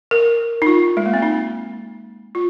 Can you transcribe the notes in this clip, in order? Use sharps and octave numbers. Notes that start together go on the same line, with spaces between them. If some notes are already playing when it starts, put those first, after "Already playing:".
A#4
D#4
F4
G#3
A#3
C4
D#4
F4